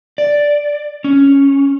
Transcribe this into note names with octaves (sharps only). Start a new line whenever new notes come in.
D5
C#4